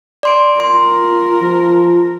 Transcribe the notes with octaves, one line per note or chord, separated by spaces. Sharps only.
D5 C6 D7
F4 A#4 C6
F3